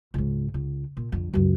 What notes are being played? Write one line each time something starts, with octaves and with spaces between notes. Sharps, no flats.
C#2 G#2
C#2
A#2
F2 D3
C#2 F#2